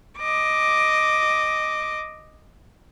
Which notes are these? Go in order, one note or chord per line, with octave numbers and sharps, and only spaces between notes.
D#5 D6